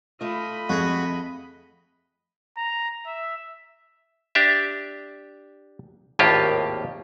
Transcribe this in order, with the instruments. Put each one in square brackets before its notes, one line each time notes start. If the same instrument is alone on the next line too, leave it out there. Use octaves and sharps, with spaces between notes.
[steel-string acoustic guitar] A3 F4 [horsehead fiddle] D#5 B5
[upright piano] F2 [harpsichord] F#4 G#4
[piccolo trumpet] A#5
E5
[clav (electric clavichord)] D4 G4 E5
G#1 D#2 A2 A#3 F4 G4